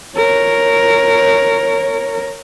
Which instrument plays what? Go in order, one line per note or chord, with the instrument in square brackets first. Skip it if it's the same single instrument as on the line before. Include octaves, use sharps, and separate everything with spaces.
[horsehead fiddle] A#4 C#5